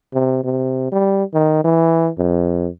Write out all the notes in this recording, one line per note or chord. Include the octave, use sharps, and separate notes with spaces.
C3
C3
G3
D#3
E3
F2